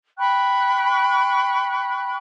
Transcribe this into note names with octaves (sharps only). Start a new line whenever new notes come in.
G5 B5 C#6 F#6